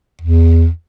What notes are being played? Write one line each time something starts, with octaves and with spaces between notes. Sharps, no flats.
E2